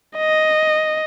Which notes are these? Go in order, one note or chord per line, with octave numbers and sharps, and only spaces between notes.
D#5